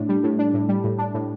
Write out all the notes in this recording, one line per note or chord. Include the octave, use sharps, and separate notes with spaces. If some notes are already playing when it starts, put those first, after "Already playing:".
Already playing: A2 D4
G3
A2
D4
A2
G3
A2
D4
A2